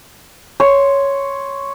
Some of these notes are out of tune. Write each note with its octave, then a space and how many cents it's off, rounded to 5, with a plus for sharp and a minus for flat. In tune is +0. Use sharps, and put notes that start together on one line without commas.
C#5 +0 C6 +0